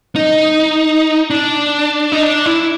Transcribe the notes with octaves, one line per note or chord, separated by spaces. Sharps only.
D#4
D4
D#4
D4
E4